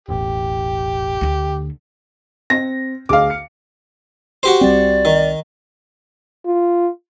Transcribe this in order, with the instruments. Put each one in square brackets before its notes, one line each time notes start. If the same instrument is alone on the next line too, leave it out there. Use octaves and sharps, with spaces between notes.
[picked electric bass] E1 A1 [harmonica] G4
[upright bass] D2 D3
[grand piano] C4 [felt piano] A#6
[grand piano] D2 G#4 [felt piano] F5 D6
[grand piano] C#7
[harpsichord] F#4 G4 C5
[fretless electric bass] C2 G3 C4 [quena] D5
[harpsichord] D#3
[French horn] F4